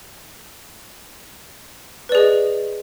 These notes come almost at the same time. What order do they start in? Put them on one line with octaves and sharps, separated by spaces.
B4 D5 G#4 D#5